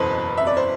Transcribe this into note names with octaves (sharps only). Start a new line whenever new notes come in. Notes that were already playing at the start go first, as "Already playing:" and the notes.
Already playing: F#1 E2 B2 A4 B4 C5
E5
D5
C5